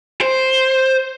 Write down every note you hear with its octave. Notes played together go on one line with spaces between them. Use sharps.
C5